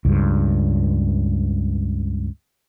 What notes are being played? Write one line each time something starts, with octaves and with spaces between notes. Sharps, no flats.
C#2 G2